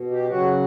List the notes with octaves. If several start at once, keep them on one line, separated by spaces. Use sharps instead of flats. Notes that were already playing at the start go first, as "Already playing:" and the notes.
Already playing: B2
G4
C#3 F#3 F#4